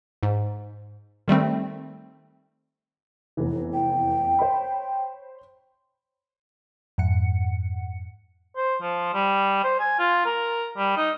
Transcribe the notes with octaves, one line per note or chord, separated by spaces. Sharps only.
G#2
D#3 G3 A3 C4
F1 E2 E3
G5
C5 C#5 B5
F2 G#2 F#5 C#7
C5
F3
G3
C5
G#5
F4
A#4
G3
D#4